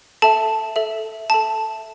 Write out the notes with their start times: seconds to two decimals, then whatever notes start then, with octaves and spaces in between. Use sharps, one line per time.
0.22 A4 E5 A5
0.76 A4 E5
1.30 A4 E5 A5